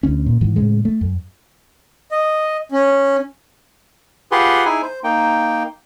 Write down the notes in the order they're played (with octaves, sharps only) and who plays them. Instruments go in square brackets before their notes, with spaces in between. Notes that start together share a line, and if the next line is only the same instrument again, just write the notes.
[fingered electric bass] D2 C#4
A#2
G#2 E3
A2 C#3 G#3
A3
F#2
[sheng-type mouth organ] D#5
C#4
[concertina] F4 G4 G#4 B4 F#5 C6
D#4 E4 G#4 G#5
C5
A#3 D#4 G5